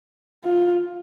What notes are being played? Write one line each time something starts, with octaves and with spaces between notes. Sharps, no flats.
F4